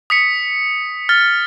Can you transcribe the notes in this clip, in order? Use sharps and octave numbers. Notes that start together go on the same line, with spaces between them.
D#6 B6 C#7
F6 A6